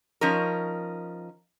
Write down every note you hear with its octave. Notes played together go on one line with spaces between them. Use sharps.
F3 C#4 D#4 A#4